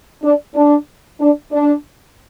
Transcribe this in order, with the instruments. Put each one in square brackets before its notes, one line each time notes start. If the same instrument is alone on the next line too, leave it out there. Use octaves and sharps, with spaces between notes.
[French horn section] D4
D4
D4
D4